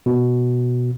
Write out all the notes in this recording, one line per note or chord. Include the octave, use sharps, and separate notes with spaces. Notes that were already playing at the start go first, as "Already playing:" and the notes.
B2